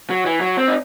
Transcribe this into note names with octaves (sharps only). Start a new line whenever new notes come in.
F#3
E3
F#3
C4
D#4